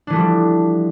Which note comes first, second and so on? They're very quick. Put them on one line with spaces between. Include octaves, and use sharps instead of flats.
D4 E3 A3 F3 G3